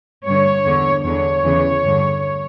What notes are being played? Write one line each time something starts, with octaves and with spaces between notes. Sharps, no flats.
G2 D3 C#5
E2 D3
E2 D3 C#5
E2 C#3 E3
G2 D3